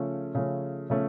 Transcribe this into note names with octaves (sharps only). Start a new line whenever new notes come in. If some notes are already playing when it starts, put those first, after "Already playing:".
Already playing: C#3 F3 A3 C#4
C#3 F3 A3 C#4
C#3 F3 A3 C#4